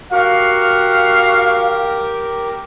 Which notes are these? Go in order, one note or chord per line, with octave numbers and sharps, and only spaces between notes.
F#4 G4 A#4 F5